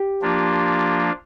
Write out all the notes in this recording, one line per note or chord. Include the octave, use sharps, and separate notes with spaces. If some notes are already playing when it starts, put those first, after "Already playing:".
Already playing: G4
F3 A#3 D4 F4